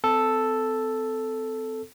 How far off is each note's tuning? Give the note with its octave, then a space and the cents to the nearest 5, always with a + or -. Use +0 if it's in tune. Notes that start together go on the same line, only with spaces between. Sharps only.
C4 -35 A4 +0